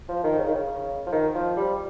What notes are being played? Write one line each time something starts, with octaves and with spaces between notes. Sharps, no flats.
F3
D#3
C#3
D#3
C#3
F3
D#3
F3
G3